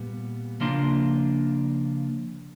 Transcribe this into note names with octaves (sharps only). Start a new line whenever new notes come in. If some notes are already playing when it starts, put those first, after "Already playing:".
Already playing: A#2 G3 B3
C#3 F3 A#3 D4 F4 C6